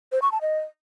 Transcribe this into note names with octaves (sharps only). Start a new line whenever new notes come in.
C5
C#6
A5
D#5